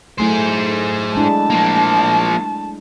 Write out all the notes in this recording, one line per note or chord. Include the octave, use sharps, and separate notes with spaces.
F#3 A3 E4 G#4 C5
G#3 D4 E4 A5
F3 A#3